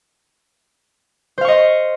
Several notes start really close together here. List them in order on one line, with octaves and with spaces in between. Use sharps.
C5 F5 C#6 D#5 C6